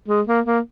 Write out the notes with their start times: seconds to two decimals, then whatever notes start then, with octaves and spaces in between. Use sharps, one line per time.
0.08 G#3
0.27 A#3
0.46 A#3